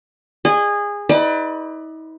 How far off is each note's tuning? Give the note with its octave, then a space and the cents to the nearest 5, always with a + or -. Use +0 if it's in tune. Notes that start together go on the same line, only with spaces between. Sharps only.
G#4 -20 D#5 -45
D#4 +45 B4 +20 D5 +30